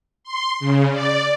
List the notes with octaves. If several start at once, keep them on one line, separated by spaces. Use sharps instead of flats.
C6
C#3
D5